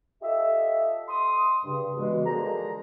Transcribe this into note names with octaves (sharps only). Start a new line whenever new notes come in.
F4 G4 A4 D#5 E5
C6 D#6
G2 C#3
G2 B2 E3 G#3
D3 F3 A#3 G#4 C5 A#5